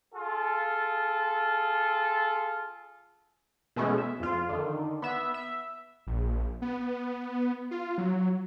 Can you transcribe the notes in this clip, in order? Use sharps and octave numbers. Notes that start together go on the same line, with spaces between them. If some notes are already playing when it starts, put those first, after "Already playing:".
F4 G#4 A4
B2 E3 G#3 A3 B3 C#4
E5
F2 F4
D3 D#3
B3 E5
E5
A#1
B3
F4
F#3